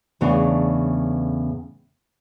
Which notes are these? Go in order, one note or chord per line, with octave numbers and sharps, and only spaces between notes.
E2 A2 C#3 B3 D4